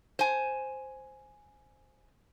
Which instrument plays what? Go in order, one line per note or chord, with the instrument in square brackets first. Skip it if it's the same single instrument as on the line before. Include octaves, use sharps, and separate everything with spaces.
[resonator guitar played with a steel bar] C5 G#5